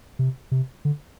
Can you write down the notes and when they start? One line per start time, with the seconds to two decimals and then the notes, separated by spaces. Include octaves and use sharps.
0.19 C3
0.51 C3
0.85 D3